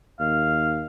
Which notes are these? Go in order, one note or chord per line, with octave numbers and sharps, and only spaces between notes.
D#2 F5